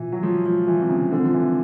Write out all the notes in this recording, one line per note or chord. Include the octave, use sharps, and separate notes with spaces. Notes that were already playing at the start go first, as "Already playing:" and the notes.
Already playing: B2 E3 F4
F#3
F3 G#3
F3
E3 F4
C3
C#3
D3 C4
F3
E3